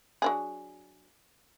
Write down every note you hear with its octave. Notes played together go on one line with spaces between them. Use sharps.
F#3 D4 G#4